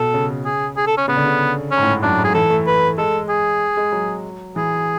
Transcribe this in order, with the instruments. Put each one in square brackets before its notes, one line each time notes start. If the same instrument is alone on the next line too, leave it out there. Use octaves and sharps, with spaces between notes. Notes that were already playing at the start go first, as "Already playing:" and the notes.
Already playing: [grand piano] B2 [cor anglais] A4
[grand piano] C#3
[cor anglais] G#4
G#4
A4
C#4
[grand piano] C#3 [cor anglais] B3
[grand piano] D3
C#3
[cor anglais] C#4
[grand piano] G#2
A2
G#2
[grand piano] F#2 [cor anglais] D4
[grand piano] G#2
[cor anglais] G#4
[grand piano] E3 [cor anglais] A4
[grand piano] A3
[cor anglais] B4
[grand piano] G#3 [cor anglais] A4
[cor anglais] G#4
[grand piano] G#3
F#3
[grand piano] E3 [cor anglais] G#4